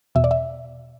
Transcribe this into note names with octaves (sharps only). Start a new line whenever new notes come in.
E2 B2 E5
D5
E5